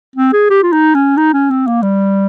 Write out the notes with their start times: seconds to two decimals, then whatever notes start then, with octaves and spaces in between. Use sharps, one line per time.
0.16 C4
0.33 G#4
0.50 G4
0.63 F4
0.73 D#4
0.95 C#4
1.17 D#4
1.33 C#4
1.50 C4
1.67 A#3
1.83 G3